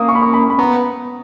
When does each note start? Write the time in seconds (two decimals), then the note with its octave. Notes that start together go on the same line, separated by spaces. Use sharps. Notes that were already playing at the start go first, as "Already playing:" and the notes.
Already playing: A#3 D#6
0.09 C#6
0.15 B5
0.22 C#6
0.34 B5
0.50 B5
0.59 B3 A#5